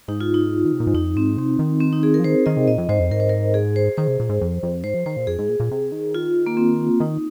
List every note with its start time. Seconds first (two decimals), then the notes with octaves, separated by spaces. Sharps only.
0.08 G#2 D#4
0.21 F4
0.34 D#4
0.65 D#3
0.72 C3
0.80 A#2
0.87 G#2
0.94 F2 D#4
1.16 G#2 C4
1.37 C3 C4
1.59 D#3
1.81 C4
1.93 D#4
2.03 G#4
2.14 A#4
2.20 F3
2.24 D#3 C5
2.46 D#3 D#5
2.57 C3
2.67 A#2 D#5
2.78 F2
2.89 G#2 C5
3.00 F2
3.11 G#2 A#4
3.20 C5
3.29 A#4
3.54 G#4
3.76 C5
3.97 D#3 C5
4.08 C3
4.20 A#2
4.29 G#2
4.41 F2
4.63 F2
4.84 G#2 C5
4.94 F3
5.06 D#3 C5
5.17 A#2
5.27 F2 G#4
5.39 G#2
5.49 A#2
5.60 A#2
5.71 C3
5.92 D#3
6.14 F4
6.46 A#3
6.57 C4
7.00 D#3 D#4